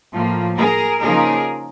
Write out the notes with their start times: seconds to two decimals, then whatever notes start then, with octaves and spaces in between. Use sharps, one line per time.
0.11 A2 F3 A#3
0.57 G#4 A#4
1.00 C#3 F3 A#3 D#4 G#4 A#4